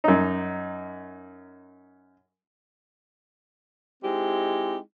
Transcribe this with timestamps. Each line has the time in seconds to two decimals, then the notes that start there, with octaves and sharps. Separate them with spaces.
0.04 F#2 D#4
4.03 G#3 C4 D#4 E4 G4